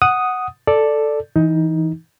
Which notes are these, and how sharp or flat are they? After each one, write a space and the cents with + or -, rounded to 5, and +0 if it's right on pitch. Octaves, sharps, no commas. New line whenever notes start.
F#5 +0 D#6 +0
A4 +0 D5 +0
E3 -5 D#4 +15